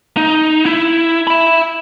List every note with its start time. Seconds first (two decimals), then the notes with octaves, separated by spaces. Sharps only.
0.17 D#4
0.66 E4
1.27 E5 B5